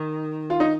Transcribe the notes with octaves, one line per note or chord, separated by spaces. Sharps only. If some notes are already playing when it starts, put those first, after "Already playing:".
Already playing: D#3
F4
D#4